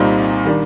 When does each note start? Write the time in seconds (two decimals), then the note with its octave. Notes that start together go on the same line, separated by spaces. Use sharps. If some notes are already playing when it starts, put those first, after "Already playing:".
Already playing: C2 A#2 G3 C4 D#4
0.45 D#3 G3 D4